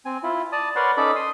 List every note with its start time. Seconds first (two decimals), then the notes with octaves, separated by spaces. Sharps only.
0.06 C4 G#5
0.23 E4 F4
0.52 D5 A5 D#6
0.76 A#4 B4 C#5 D5 F#5 C6
0.97 C#4 D#4 A4 D5 B5 D6
1.16 C6 D#6